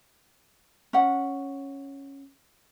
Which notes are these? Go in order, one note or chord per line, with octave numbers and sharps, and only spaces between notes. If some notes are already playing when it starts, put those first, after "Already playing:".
C#4 F#5